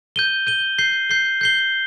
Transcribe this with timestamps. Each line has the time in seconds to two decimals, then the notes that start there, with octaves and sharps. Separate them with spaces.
0.16 G6 D#7 G7
0.47 G6 D#7 G7
0.78 G6 C7 G7
1.10 G6 C7 G7
1.41 G6 C7 G7